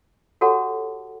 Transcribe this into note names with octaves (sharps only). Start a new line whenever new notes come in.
F#4 G4 A4 C#5 F#5 A5